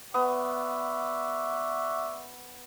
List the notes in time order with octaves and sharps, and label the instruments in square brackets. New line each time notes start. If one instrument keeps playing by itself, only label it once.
[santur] B3 D#6 [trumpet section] F#4 D5 E5